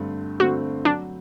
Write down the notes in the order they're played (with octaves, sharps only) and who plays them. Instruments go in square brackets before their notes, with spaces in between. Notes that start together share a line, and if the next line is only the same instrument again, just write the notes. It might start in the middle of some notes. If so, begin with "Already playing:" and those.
Already playing: [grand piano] G2 D3 A3 C4
[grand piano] D3 A3 C4 [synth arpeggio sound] F#4
[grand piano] F#3 [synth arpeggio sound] D4